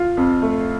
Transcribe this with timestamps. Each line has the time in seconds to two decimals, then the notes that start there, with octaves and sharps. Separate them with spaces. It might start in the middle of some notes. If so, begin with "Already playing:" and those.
Already playing: F4
0.17 F2
0.42 A3